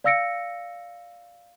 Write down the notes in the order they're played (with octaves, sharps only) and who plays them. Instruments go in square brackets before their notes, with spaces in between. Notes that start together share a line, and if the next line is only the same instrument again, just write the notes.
[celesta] D5 F5 E6 A#6 C#7 D7